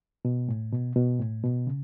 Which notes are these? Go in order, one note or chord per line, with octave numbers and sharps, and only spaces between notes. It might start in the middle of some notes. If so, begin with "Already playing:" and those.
B2
A2
B2
B2
A2
B2
C#3